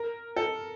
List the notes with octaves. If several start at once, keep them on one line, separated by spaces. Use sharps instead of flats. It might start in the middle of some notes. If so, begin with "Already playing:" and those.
Already playing: A#4
A4